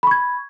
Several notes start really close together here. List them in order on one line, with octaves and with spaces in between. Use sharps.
B5 C#6 G#6